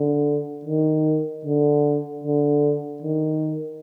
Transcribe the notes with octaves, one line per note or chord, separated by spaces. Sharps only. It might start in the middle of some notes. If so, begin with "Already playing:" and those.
Already playing: D3
D#3
D3
D3
D#3